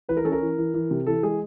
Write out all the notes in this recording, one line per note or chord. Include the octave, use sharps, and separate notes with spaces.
E3 B4
A#4
C#4 A4
A#4
E3
E3
E3
C3
E3 A4
G#3 G#4